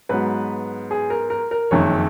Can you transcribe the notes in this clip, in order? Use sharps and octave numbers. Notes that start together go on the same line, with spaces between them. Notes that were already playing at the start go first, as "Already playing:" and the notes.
G#2 F#3 B3 B4
G#4
A#4
A#4
A#4
F#1 F2 D#3 C#5